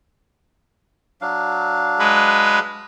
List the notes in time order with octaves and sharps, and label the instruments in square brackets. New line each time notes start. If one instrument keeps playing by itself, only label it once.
[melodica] F#3 D4 F5
[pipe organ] G#3 B4